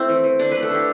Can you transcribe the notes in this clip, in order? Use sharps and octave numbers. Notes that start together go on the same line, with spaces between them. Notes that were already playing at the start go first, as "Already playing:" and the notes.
Already playing: A3 C4 E4
E3
E3
D3 D4
A3 B4
A4
D3 G4